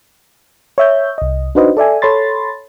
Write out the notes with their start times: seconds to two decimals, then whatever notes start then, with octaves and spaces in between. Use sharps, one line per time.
0.78 C#5 E5 G6
1.18 C2 D#5
1.55 D4 D#4 F#4 B4 C5 D#5
1.77 A4 D5 E5 G#5
2.02 A4 C#5 B5 C6 A6